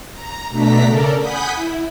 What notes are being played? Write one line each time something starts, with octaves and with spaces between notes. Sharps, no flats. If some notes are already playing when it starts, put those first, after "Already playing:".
A#5
B2 A3 D4 A#5 B6
C#3 A4 A#4 D5
F#5 G#5 B5 D#6 G6 B6
E4